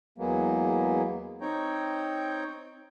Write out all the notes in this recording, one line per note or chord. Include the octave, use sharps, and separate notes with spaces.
E2 F#3 G#3 A#3 B3
C4 D#4 C#5 G5 A#5